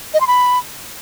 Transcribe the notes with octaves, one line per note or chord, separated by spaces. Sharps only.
D#5
C6
B5